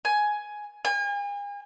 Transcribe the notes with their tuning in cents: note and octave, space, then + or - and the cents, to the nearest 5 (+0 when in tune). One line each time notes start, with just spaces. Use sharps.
G#5 +10
G#5 -40